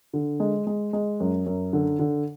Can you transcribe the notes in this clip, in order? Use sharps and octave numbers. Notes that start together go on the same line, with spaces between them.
D3
G#3
G#3
G#3
F#2
F#2
D3
D3